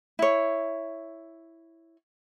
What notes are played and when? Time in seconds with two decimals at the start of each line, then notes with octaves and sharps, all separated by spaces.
0.19 E4 C#5